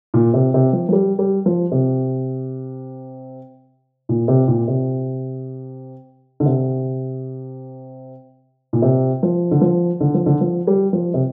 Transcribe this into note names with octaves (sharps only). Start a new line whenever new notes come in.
A#2
C3
C3
F3
F3
G3
G3
F3
C3
A#2
C3
A#2
C3
D3
C3
A#2
C3
F3
D3
F3
D3
F3
D3
F3
G3
F3
C3